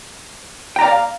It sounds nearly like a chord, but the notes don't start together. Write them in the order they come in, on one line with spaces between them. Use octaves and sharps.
G5 A#5 D5 F5